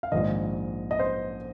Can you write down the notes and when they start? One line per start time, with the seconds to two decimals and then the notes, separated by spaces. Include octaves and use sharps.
0.03 F5
0.12 A#1 G#2 D#3 D#5
0.91 D#5
0.99 C5